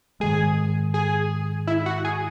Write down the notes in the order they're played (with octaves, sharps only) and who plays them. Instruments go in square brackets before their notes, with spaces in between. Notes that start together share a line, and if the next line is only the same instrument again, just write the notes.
[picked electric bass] G#2 D#3 G#3 [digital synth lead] G#4
[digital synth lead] G#4
E4
F#4
G#4